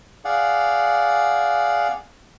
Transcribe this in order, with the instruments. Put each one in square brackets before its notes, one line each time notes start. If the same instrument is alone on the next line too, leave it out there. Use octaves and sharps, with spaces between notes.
[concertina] G#4 D5 F5 F#5